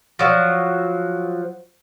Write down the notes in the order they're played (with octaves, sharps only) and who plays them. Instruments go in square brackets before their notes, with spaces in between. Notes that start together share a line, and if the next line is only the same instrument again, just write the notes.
[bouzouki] F3 F#3